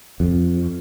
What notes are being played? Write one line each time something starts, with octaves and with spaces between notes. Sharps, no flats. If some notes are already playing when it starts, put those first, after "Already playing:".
F2